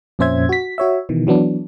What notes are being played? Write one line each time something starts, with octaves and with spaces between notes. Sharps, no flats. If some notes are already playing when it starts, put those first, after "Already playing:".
F2 A#2 C#4 C5 E5 G#6
F#4 B6
F#4 C#5 E5
B2 D#3 E3
E3 F#3 B3 D4